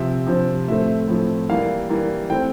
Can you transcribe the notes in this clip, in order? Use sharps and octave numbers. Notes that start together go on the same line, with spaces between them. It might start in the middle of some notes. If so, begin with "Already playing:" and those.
Already playing: C3 F3 C4 E5
C3 F3 C4
A2 F3 A3 C4 E5
A2 F3 A3 C4
E3 G3 A#3 F5
E3 G3 A#3
E3 A3 C4 G5